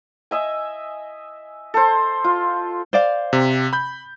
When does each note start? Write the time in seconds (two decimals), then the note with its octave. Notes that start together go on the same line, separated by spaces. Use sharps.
0.31 D#5 E5 G#5
1.74 A4 C5
2.24 F4
2.93 C5 D5 F5
3.33 C3
3.73 B5 G6